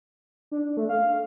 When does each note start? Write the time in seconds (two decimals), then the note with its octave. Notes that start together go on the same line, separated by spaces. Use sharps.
0.51 D4
0.77 A3
0.89 F5